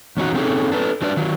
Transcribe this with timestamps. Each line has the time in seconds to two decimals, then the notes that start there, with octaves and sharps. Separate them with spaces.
0.17 E2 C#4 D#4 F#4
0.34 A3 C4 C#4 D#4 G#4 A4
0.72 D4 A4 B4
1.02 F#3 D4 B4 D5
1.17 D#3 F#3